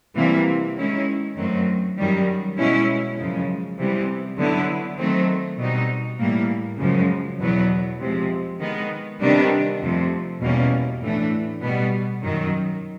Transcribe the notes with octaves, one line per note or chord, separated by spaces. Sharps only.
C3 E3 G3 A#3
D#3 G#3 C#4 E4
F#2 D#3 F#3 A3 C4
F#2 D#3 G3
B2 G#3 C#4 E4
F#2 C#3 F3 G#3
C3 E3 G3 B3
D3 F#3 B3 E4
D#3 F#3 A3 C4
B2 G3 C4 D#4
A2 E3 G3 A#3
F#2 C#3 F3 G#3
E2 B2 F#3 B3
C3 F3 G#3
D#3 G#3 B3
C3 D#3 G3 B3 D4
F2 C3 F3 A3
E2 B2 G3 A#3 C#4
A2 E3 A3 D4
B2 G3 B3
F#2 D#3 F#3